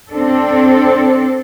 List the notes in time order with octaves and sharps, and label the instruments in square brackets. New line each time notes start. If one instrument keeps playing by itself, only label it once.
[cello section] C4 D4 A4